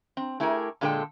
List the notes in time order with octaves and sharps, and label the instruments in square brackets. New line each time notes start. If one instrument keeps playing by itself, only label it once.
[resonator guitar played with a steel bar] C4
A3 E4 G4 G#4 A#4
A#2 D3 G#3 A4 B4 G5